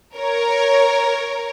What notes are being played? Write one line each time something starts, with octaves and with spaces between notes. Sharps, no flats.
A#4 C#5